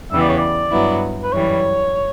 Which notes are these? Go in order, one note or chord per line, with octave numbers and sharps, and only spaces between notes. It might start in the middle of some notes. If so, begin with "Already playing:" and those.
E2 C#3 E3 G3 B3 E5
D5
C#5
D5
G2 F#3 B3 E4
B4
F#2 E3 G3 C#5